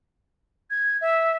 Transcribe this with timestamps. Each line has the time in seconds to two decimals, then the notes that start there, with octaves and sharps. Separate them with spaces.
0.70 G#6
1.01 E5